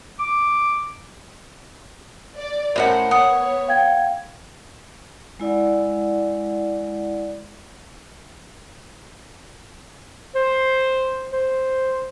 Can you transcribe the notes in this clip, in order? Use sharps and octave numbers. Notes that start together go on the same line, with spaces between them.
D6
D5
A2 C#4 E4 A#4 C5 F#5
B3 C#5 F#5 D#6
F5 G5 G#6
G#3 E4 D5 F#5
C5
C5